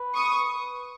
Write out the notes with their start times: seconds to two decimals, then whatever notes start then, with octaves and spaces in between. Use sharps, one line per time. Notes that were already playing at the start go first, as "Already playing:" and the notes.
Already playing: B4
0.14 C#6 D#6